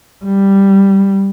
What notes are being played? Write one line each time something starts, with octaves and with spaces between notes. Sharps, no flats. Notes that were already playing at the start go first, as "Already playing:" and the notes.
G3